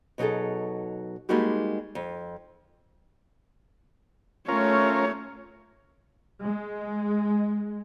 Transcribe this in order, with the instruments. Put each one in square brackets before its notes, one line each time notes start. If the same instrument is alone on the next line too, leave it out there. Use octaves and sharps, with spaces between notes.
[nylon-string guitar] B2 F#3 D#4 G#4 A4
G3 G#3 A#3 D#4 F#4 G4
F2
[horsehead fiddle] A3 C#5 [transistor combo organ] C#4 F4 A#4
[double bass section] G#3